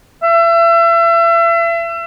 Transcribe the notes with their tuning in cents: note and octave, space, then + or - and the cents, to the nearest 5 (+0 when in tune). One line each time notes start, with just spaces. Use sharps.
E5 +35